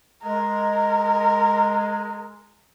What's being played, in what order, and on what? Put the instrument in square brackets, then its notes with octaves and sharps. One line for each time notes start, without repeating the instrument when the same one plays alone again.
[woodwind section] G#3 [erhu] A#4